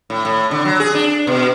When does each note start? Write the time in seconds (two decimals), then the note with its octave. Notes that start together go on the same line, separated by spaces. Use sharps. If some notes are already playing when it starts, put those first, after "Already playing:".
0.10 A2
0.25 A2
0.51 D3
0.65 F#3
0.80 G#4
0.95 D4
1.27 B2